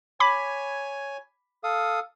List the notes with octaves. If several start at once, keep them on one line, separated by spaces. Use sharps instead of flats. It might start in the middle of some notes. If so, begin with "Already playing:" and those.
C#5 G#5 B5 D6 B6
A4 F5 D#6